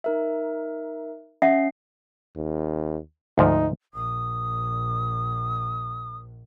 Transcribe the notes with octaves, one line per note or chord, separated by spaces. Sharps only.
D#4 A#4 E5
C#4 E5 F#5 C7
D#2
D2 G#2 F3 D#4
A#1 D#6